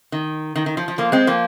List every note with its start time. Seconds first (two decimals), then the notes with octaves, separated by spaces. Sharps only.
0.12 D#3
0.56 D#3
0.66 D#3
0.77 F3
0.88 F3
0.98 F3 A#3
1.12 G#3 C4
1.27 F3 A#3